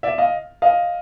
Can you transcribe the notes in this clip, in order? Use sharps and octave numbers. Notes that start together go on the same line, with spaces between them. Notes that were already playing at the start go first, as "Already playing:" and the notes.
D5 E5
D#5 F5
D#5 F5